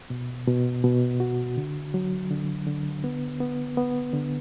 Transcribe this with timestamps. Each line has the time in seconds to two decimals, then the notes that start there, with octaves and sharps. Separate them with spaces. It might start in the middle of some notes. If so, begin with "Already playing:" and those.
0.10 B2
0.47 B2
0.84 B2
1.20 F#4
1.57 D3
1.94 F#3
2.31 D3
2.67 D3
3.04 B3
3.40 B3
3.77 B3
4.13 D3